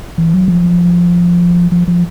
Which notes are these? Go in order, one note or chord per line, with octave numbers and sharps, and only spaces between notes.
E3
F#3
F3
F3
F3